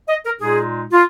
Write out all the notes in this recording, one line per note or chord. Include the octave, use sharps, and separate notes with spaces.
D#5
A#4
A#2 G#3 D#4 G#4
F4